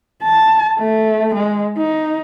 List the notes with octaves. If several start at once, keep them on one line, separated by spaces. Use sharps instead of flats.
A5
A3
G#3
D#4